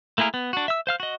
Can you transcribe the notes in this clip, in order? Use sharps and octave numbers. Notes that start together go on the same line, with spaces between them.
A3 A#3 E4 G#4 A#4
B3
D4 F#4
E5 E6
C5 F5 F6
F#4 D#5